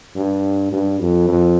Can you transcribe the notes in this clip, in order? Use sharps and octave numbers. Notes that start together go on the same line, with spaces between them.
G2
G2
F2
F2